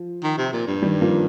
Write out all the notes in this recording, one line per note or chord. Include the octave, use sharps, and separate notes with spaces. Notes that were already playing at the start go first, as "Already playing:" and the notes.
Already playing: F3
D#3
C3
A#2
G2
D#3 G3
F3 A#3